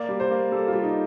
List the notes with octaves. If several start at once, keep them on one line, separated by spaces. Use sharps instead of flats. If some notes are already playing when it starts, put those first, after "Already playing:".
Already playing: A#3 D5
G3
C5
A#3
G3 A4
G3 F4
D#4